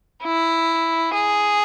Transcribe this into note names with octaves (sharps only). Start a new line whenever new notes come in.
E4
G#4